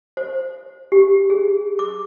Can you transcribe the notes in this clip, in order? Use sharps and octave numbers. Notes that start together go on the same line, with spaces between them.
C5
G4
G#4
D6